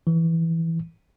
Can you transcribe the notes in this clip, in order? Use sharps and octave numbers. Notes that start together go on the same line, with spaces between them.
E3